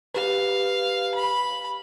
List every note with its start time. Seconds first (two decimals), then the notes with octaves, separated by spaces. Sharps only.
0.15 G4 B4 F5
1.15 B5